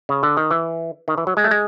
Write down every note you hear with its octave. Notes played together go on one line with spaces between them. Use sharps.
C#3
D3
D#3
E3
D#3
E3
F#3
G#3
A3
G#3